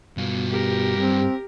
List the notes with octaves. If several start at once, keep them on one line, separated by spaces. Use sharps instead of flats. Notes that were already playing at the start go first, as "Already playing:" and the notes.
G2 B2 F4
G4 A#4
G3 C4